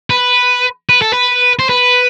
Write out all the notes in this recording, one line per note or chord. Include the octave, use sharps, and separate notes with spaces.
B4
B4
A4
B4
C5
B4